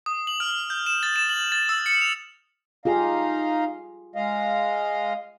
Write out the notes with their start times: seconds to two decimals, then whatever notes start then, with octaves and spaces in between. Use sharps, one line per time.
0.06 D#6
0.27 F#7
0.40 F6
0.70 G6
0.87 E7
1.03 A6
1.16 E7
1.29 F#7
1.52 A6
1.69 E6
1.86 C#7
2.01 F7
2.85 D#4 F4 G4 G#4 D#5 F5
4.16 G#3 D#5 F5